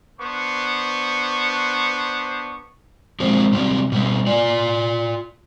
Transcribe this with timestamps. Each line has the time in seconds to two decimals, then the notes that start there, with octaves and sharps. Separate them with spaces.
0.20 B3 D4 C5 C#6
3.20 F3 G#3 C4
3.53 C3 F#3 G3 C4
3.92 B2 G3
4.27 F4 D5